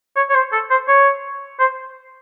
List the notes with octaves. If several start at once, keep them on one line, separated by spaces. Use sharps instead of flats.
C#5
C#5
C5
A4
C5
C#5
C5